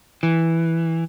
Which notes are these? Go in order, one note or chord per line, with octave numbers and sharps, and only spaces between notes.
E3